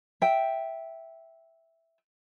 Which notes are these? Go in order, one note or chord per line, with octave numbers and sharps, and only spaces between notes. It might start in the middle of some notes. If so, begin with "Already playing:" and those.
E5 G5